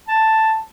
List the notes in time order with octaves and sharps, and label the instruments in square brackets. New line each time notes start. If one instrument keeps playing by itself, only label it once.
[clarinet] A5